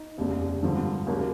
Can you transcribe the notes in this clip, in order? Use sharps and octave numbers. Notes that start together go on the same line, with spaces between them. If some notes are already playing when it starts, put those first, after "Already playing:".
Already playing: D#4
F1 D#2 C#3
G#1 G2 D3 F3
D#2 C#3 F#3 A#3 C#4